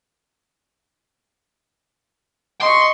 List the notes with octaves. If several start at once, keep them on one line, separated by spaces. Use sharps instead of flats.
D#5 C6 C#6